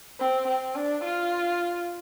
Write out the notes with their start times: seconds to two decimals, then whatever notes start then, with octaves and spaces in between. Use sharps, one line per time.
0.19 C4
0.47 C4
0.75 D4
1.03 F4